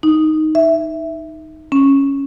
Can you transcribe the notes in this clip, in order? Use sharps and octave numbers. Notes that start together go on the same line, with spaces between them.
D#4
E5
C#4